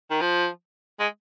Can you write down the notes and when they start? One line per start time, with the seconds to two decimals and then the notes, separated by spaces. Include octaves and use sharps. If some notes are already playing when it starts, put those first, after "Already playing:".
0.10 D#3
0.21 F3
1.00 G#3